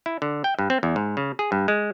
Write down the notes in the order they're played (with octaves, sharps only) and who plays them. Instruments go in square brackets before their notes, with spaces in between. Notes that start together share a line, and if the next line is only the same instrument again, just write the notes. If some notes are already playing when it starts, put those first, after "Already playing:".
[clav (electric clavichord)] E4
D3
G5
G2
C4
E2
G#2
C#3
G#4
G2
G#3